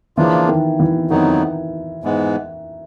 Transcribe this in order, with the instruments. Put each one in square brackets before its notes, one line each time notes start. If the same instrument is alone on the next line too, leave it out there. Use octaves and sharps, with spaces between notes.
[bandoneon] C#3 F3 A#3 D4 F4 [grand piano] E3
[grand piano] D#3
E3
[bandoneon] F2 D3 F#3 B3 D#4 [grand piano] D#3
[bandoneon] G#2 E3 G#3 B3